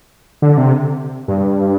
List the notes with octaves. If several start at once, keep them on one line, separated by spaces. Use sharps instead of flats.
D3
C3
G2